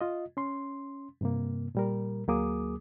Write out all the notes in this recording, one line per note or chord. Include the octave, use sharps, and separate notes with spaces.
F4 D#5
C#4 C6
G2 C3 A#3
A#2 G3 A#4
D2 F#3 A#3 G#4 D6 D#6